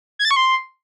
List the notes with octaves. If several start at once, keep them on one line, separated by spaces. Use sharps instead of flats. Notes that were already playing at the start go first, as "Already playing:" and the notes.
G#6
A6
C#6
C6